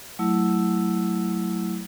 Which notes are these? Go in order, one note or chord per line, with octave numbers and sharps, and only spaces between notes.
F#3 A3 E4 E6